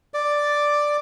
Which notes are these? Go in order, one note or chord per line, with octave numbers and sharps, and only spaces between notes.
D5